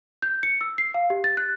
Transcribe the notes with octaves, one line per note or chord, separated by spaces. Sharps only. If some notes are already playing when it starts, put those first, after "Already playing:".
G6
C#7
E6
C7
F5
G4
A6
F#6